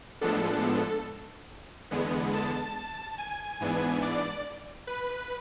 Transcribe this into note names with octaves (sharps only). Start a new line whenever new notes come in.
A2 F3 G#3 B3 D4 A4
E2 D3 G#3 B3
A5
G#5
G#2 E3 B3 D4 G#5
D5
B4